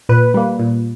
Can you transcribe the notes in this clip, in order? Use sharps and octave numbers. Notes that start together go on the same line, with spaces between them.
A#2 B4
G3 A#3
A#2